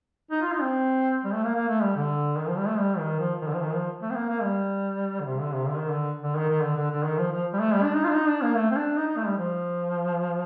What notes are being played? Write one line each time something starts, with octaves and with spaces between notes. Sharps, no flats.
D#4
F4
D#4
C4
G3
A3
A#3
A#3
A3
G3
D3
D#3
F3
G3
A3
G3
D#3
F3
D#3
D3
F3
D#3
F3
A3
C4
A#3
A#3
G3
D3
C3
D3
C3
D3
D#3
D3
D3
D#3
D#3
D3
D3
D3
D#3
F3
F3
G3
A3
G3
D4
D#4
F4
D4
D#4
D4
A#3
A3
C4
D4
D#4
D#4
A3
G3
F3